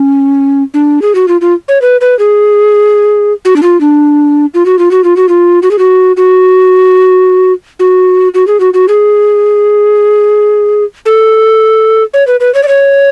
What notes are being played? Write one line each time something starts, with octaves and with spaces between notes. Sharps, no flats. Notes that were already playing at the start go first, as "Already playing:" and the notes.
Already playing: C#4
D4
G#4
F#4
F4
F4
C#5
B4
B4
G#4
F#4
D4
F4
D4
F4
F#4
F4
F#4
F4
F#4
F4
F#4
G#4
F#4
F#4
F#4
F#4
G#4
F#4
F#4
G#4
A4
C#5
B4
B4
C#5
D5
C#5